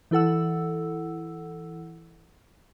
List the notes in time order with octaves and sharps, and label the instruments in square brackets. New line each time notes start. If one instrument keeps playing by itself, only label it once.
[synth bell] E3 E4 A4 F#5 E6